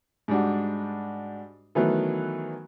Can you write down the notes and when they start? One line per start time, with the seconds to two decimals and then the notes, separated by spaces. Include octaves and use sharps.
0.28 G#2 G3 D4 F#4
1.75 D#3 E3 F#3 A3 B3